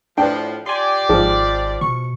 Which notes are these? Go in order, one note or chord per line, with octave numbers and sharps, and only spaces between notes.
A2 F3 D4 B4 G5
F4 G4 D5 G#5 C6
G#1 G#2 F3 G#4
B2 C#6